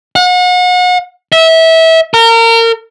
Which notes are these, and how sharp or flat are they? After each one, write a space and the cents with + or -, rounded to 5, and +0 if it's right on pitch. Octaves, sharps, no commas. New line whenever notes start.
F#5 -40
E5 -25
A#4 -30